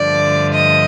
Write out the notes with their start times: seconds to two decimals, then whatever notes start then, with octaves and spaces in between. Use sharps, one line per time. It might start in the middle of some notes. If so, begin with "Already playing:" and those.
Already playing: G2 D3 F3 A3 D5
0.53 D#5